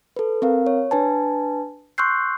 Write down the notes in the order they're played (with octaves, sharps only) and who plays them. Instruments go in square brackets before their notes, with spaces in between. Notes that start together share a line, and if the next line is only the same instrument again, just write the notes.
[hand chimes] A4 B4
C4 A#4 F5
C#5
D4 B4 G#5 A5
C6 C#6 E6 F#6 G6 C7